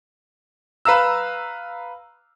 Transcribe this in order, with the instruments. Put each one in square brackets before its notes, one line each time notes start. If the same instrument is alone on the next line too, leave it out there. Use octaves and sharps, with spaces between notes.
[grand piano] B4 F5 A#5 E6